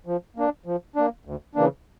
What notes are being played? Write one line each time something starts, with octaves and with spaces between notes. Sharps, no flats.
F3
A#3 D4
F3
A#3 D4
D2
C#3 E3 A#3 D4